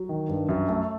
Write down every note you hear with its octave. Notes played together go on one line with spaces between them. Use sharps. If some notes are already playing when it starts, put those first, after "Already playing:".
Already playing: F#3
D#3
G2
F#2
A3